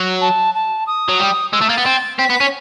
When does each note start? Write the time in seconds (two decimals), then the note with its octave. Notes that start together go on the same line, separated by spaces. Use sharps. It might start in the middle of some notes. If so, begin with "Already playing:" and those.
Already playing: F#3
0.21 A5
0.54 A5
0.87 D#6
1.08 F#3
1.20 G3
1.53 G#3 E6
1.61 A3
1.69 A#3 A6
1.78 B3
1.86 C4
2.18 C4 B6
2.30 B3
2.40 C#4